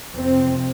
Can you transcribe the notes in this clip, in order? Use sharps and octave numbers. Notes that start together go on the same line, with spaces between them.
F2 C3 C4